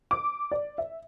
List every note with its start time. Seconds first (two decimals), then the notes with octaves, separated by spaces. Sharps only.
0.11 D6
0.52 D5
0.78 E5